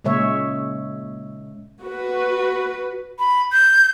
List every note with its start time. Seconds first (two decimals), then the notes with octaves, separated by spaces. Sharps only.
0.04 A#2 C#3 G#3 C#5 E5
1.83 F#4 B4
3.19 B5
3.52 G6